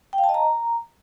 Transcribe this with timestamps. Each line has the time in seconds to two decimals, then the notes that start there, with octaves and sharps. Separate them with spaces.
0.13 G5
0.18 F5
0.24 A5
0.29 D#5
0.34 A#5